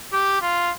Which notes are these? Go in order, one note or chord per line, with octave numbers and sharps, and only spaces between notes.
G4
F4